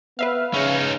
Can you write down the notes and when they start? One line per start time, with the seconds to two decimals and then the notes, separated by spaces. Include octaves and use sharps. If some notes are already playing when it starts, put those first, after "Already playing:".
0.19 B3 B4 E5 F5
0.53 C#3 C#4 D#4